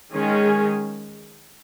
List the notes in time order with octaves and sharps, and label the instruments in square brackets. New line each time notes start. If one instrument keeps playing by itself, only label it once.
[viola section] D#3 G#3 C#4 G#4